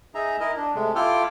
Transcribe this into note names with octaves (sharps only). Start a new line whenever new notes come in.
D#4 G#4 E5 A#5
E4 A#4 D#5
D4
C3 G#3 A3
E4 F4 A4 G5 D6 F6